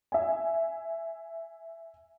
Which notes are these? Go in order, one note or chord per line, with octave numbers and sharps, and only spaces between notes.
E5 G#5